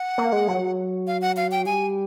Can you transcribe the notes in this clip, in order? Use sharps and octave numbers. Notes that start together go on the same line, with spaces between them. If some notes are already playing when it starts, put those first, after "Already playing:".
Already playing: F#5
A#3
G#3
F#3
F5
F#5
F5
G5
G3 G#5